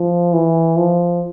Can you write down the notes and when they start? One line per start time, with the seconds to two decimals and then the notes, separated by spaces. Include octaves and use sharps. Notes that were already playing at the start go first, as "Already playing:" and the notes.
Already playing: F3
0.33 E3
0.77 F3